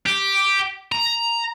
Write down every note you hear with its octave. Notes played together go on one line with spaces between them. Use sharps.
G4
A#5